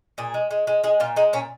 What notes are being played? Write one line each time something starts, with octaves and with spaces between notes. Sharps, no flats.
A#2 G#4
G#3
G#3
G#3
G#3 G#4
A#2 F4
G#3 D#4
A#2 C#4